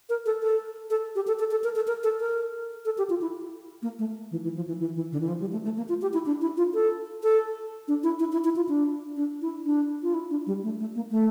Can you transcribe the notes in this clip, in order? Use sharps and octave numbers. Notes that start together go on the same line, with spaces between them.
A#4
A4
A4
A4
G4
A4
A4
A4
A#4
A4
A#4
A4
A#4
A4
G4
F4
E4
A#3
A3
E3
E3
F3
E3
E3
E3
D3
E3
F3
G3
A3
A3
A#3
F4
G4
E4
D4
E4
F4
A4
A4
D4
E4
E4
E4
E4
F4
D4
D4
E4
D4
F4
E4
D4
G3
A3
A3
A#3
A3